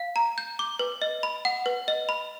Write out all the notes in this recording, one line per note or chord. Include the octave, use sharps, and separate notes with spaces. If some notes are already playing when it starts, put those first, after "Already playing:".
Already playing: F5
A#5
G6
D6
B4
D#5
B5
F#5
B4
D#5
B5